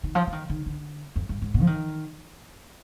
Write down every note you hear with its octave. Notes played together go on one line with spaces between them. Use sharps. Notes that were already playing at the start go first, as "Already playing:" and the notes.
D#3
F3
F3
D#3
D#3
D3
F2
G2
G#2
A#2
F3
D#3